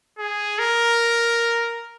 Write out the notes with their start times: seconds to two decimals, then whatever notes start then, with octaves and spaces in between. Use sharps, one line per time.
0.19 G#4
0.59 A#4